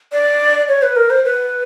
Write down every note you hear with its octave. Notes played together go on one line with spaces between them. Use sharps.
D5
C#5
B4
A#4
C5
B4